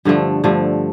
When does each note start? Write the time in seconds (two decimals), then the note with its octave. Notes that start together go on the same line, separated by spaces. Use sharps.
0.05 G2 D3 F3 A3
0.44 G2 D3 F3 A3